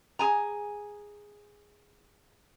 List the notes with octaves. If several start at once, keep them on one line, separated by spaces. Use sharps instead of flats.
G#4 G#5 A#5